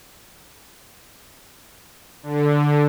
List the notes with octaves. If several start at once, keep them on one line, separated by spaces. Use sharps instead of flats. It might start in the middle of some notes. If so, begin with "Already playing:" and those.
D3